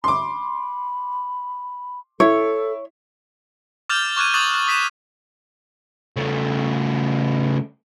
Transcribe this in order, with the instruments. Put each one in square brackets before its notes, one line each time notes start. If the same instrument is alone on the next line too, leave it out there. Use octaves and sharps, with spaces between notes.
[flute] B5 [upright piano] C6 D6
[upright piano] E4 [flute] A4 [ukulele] C#5
[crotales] D6 F6 G6 A6 F7
C#6 D6 F#6 G#6 D#7
C#6 D#6 F#6 A6 F7 F#7
F#6 A6
D#6 B6 D#7 E7
[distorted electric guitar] C#3 A3